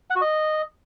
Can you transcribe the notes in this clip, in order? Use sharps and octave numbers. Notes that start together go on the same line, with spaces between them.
F#5
F#4
D#5